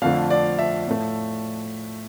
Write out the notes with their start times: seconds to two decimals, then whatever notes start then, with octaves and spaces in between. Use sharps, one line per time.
0.02 F2 D3 F3 A3 F5
0.30 D5
0.59 E5
0.88 A2 F3 A3